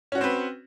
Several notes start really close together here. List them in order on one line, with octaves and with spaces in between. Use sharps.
C#4 F#4 C#5 C4 B4